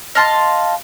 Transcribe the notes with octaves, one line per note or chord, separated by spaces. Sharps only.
D#5 F5 A5 C6